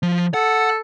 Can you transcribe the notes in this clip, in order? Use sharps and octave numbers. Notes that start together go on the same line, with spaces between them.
F3
A4 F#5